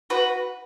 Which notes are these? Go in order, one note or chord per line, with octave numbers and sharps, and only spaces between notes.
F#4 B4